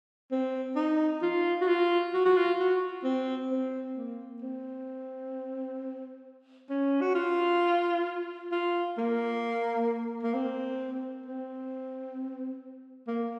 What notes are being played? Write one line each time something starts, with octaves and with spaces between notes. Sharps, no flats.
C4
D#4
F4
F#4
F4
F#4
F#4
F4
F#4
C4
C4
A#3
C4
C#4
F#4
F4
F4
A#3
A#3
C4
C4
A#3